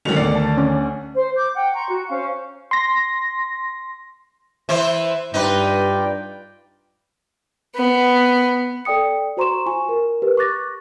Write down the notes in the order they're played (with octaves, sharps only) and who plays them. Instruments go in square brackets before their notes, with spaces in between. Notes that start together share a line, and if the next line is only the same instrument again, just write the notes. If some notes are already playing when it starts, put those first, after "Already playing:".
[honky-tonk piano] F#1 C#2 [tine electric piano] D3 D#3 [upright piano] F#3 F7
[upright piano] D2 C7 [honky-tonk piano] D5
[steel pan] A5
C#4
[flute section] C5
D6 G6
F#5 G5
A#5 C6 C#6
F#4
C#4 C5 F5
[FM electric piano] C6 A#6
[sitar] E3 E4 C5
[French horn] G2 [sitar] D#4 B4 [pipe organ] F4 D5 G5
[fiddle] B3
[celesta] A4 D5 G5 D#6 C#7
F#4 C5 A#5 C6 C#6 E7
F4 G#5 C#6
A#4
G4 A#4 B4
C#6 D6 F#6 A6 A#6